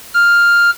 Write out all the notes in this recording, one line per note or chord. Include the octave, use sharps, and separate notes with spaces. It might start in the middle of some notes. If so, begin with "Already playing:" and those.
F6